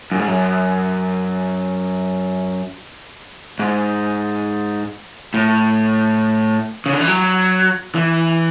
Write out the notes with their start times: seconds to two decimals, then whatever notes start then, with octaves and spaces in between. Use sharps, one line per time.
0.11 F#2
0.19 G#2
0.28 F#2
3.59 G#2
5.34 A2
6.86 C#3
6.93 D3
7.00 E3
7.07 F#3
7.95 E3